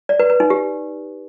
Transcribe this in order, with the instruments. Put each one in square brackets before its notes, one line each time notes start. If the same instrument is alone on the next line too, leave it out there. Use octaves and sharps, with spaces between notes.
[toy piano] D5
B4
B4
D#4
G4